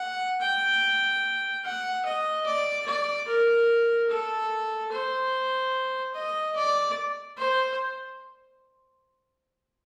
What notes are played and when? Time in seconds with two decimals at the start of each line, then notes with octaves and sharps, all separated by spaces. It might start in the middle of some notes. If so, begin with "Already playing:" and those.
Already playing: F#5
0.41 G5
1.64 F#5
2.05 D#5
2.46 D5
2.86 D5
3.28 A#4
4.09 A4
4.92 C5
6.14 D#5
6.56 D5
7.37 C5